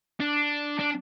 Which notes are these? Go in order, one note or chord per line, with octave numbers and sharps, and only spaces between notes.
D4
D4